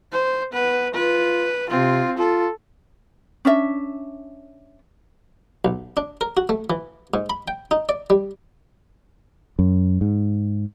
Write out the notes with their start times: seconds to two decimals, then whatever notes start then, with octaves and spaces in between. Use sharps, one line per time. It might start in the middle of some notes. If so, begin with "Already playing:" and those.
0.13 C5
0.53 B3 B4
0.94 F4 B4
1.70 C3 C4 F4
2.18 F4 A4
3.45 C#4 D4 E5
5.65 B1
5.97 D4
6.21 A#4
6.37 F#4
6.49 A3
6.70 E3
7.14 G#2
7.30 B5
7.48 G5
7.71 D#4
7.89 D5
8.10 G3
9.59 F#2
10.01 G#2